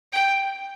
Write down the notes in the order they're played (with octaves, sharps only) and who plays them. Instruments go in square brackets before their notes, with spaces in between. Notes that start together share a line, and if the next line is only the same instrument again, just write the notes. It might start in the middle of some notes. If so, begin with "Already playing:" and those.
[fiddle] G5